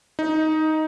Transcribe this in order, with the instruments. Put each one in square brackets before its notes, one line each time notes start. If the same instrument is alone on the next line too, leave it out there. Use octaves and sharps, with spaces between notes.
[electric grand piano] D#4